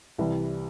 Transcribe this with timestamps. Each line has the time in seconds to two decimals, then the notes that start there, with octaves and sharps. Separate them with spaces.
0.18 C2 C3 E3 G3